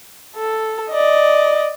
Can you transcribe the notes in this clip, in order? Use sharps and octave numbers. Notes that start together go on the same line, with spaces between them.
A4
D5 D#5